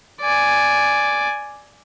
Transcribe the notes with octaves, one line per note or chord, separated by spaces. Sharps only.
D5 G#5